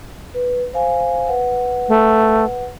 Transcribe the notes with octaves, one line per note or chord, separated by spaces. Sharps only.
B4
C5 F5 G#5
B4 F#5
A3